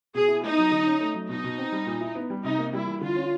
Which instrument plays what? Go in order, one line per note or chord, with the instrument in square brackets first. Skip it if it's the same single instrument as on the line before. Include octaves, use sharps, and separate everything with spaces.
[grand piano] B2 [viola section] G#4
[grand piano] E4
[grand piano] B3 [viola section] D#4
[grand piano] F#3
D3
C#4
A3
F#3
[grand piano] B2 [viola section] D#4
[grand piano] B2
C4
G3
A#2
E4
B3
G3
[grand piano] C3 [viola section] D#4
[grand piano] A#3
[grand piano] G3 [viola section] E4
[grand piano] E3
[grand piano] D3 [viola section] F4
[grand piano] C#4